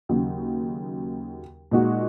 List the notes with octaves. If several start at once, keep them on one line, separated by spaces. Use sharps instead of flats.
D#2 C#3 F#3
A#2 G#3 D#4 F#4